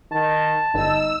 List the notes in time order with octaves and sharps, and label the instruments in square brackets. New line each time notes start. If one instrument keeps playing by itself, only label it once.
[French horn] D#3 [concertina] A5
[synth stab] G1 [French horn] D#4 [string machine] E6